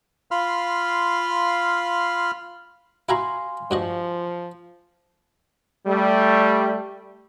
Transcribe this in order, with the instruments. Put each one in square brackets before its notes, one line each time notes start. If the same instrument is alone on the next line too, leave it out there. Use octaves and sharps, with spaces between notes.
[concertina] F4 F5 B5 C6 F6
[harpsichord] E4 F#4 A#5 [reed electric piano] F5 G#5 C6
[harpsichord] G2 F#4 D#5 [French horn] F3
[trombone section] G3 A3